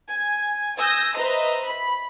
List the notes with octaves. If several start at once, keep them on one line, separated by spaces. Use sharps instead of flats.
G#5
G#5 D#6 E6 G6 A#6
B4 C5 D#5 E5 A#5
B5